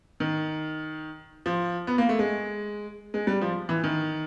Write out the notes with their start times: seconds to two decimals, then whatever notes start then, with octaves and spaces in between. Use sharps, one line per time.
0.20 D#3
1.46 F3
1.87 B3
1.98 A#3
2.09 A3
2.19 G#3
3.14 G#3
3.27 G3
3.41 F3
3.69 E3
3.84 D#3